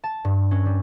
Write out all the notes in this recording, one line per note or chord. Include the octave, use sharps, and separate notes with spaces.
A5
G2
C#4
G3